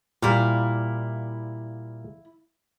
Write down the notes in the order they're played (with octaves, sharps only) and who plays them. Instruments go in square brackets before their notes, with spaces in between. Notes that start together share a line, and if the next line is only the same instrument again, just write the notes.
[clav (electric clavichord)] A#2 G3 [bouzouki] E4 F5